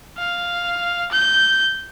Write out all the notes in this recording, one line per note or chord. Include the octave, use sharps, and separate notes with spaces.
F5
G6